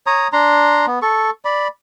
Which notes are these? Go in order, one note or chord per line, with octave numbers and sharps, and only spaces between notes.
C#5 A#5 D#6
D4 A#5 C6
B3
A4 C#6
D5 B5